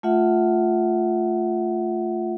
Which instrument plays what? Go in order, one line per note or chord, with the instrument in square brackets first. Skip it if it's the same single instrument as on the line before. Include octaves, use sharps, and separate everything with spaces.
[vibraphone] A3 F4 E5 F#5